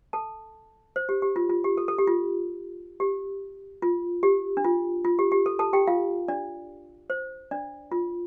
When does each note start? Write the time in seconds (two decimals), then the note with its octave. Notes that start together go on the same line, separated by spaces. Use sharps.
0.13 A4 A5
0.96 C5
1.09 G4
1.22 G4
1.36 F4
1.49 F4
1.64 G4
1.77 A4
1.88 A4
1.98 G4
2.07 F4
3.00 G4
3.82 F4
4.23 G4
4.57 D4
4.64 F4
5.04 F4
5.19 G4
5.32 G4
5.46 A4
5.59 A4 A5
5.73 G4 G5
5.87 F4 F5
6.28 D4 D5
7.10 C5
7.51 D4 D5
7.92 F4